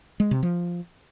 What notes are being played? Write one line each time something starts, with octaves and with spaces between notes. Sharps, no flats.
G#3
C3
F3